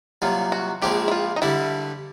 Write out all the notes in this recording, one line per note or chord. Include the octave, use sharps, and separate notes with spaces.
C2 A#2 F#3 F4
F#4
A#1 A#2 F3 G#3 C4 G4
E4
F4
D#4
G2 D3 G3 E4